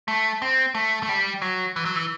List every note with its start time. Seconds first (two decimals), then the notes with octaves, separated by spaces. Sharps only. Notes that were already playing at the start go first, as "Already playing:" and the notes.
0.08 A3
0.42 C4
0.75 A3
1.03 A3
1.09 G3
1.42 F#3
1.76 E3
1.85 F#3
1.95 E3